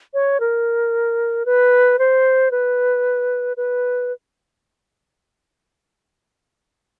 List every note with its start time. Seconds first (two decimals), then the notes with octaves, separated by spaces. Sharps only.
0.14 C#5
0.40 A#4
1.45 B4
1.99 C5
2.51 B4
3.57 B4